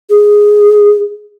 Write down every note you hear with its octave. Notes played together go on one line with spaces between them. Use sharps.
G#4